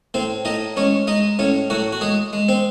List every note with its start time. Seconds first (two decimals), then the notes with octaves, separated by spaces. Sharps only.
0.14 A2 C4 C5
0.45 A2 D#4 D#5
0.76 G#3 C#4 C#5
1.07 G#3 D#4 D#5
1.39 A2 C#4 C#5
1.70 A2 F#3 F#4
1.92 F#4
2.01 G#3 G#4
2.33 G#3
2.49 C4 C5